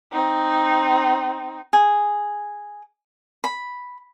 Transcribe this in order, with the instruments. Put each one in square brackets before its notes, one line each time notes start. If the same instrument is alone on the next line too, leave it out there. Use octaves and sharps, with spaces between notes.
[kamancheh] C4 D#4
[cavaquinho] G#4
B5